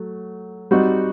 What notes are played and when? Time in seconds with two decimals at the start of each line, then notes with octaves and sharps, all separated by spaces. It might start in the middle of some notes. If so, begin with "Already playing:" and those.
Already playing: F#3 A3
0.71 G3 C4 D#4 F#4